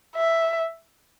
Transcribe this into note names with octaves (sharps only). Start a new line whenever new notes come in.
E5